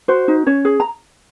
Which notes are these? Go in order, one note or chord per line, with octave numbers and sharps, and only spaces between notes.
F#4 C5
D#4
C#4 C#5
G#4
A#5